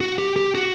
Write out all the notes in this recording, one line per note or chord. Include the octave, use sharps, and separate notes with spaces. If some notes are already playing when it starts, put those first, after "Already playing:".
F#4
G4
G4
F#4